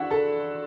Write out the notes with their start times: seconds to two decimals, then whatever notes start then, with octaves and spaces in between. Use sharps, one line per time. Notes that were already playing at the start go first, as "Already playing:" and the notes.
Already playing: D4 E4 F#4 E5 F#5
0.11 A4 A5